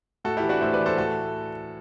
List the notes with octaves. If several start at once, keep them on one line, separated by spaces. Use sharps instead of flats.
A2 F#4 A4
E4 G4
E3
D4 F#4
A2 C5 E5
B4 D5
E3
A4 C5
A2 F#4 A4